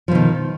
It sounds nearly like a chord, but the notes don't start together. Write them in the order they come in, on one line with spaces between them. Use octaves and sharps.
F3 B2 D#3